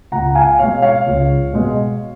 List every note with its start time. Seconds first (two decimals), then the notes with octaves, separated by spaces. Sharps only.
0.12 C#2 F#5 A#5
0.35 F5 G#5
0.59 B2 G#3 C#5 F5
0.82 C#5 F5
1.06 C#2
1.53 B2 G#3